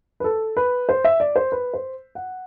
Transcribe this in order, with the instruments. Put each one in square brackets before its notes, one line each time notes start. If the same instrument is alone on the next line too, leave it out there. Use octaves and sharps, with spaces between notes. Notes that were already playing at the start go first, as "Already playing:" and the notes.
[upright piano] B4
A4
B4
C5
E5
D5
C5
B4
C5
F#5